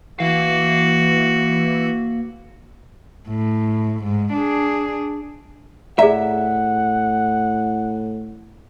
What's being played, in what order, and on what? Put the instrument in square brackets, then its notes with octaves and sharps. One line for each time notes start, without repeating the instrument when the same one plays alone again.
[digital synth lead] E3 [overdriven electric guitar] A#3 F5 [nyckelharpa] F#4
[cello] A2
G#2
D4 G#4
[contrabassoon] A2 [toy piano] G#4 D5 A#5 [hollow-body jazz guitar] E5 [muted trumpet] F#5